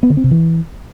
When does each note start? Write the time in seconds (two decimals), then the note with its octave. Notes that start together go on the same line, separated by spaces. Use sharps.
0.03 B3
0.10 D3
0.17 C4
0.24 C3
0.31 E3